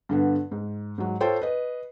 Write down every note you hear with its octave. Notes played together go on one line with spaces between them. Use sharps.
G2 D3 B3
G#2
G#2 F#3
F4 A4 C5 C#5 G5
B4 D#5